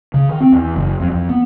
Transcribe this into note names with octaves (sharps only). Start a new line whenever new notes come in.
C#3
D#3
C4
E2
F#1
F2
F2
B3